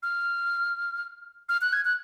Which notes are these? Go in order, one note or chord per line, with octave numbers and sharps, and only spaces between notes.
F6
F6
F#6
G#6
F#6